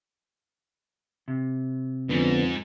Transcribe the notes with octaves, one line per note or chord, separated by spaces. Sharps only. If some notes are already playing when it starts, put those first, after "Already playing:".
C3
F2 G#2 D3 B3